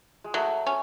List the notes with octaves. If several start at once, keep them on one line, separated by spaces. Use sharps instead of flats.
G#3
F#3 A3
C#4